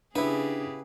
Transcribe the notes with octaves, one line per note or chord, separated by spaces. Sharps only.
C#3 B3 D4 E4 G4 G#4 B4